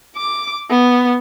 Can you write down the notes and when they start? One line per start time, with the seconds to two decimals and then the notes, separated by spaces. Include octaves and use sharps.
0.16 D6
0.70 B3